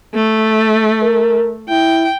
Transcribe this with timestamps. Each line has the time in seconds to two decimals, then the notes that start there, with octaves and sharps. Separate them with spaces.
0.14 A3
1.03 A#4
1.69 E4 G5